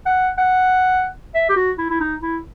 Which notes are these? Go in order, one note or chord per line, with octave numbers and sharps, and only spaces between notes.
F#5
F#5
E5
G4
F#4
E4
E4
D#4
E4